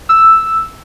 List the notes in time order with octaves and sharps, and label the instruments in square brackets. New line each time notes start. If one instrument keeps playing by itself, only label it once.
[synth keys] E6